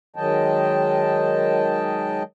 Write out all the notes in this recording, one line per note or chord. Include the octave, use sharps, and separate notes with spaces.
D#3 F#3 G#3 D#5 G5 A5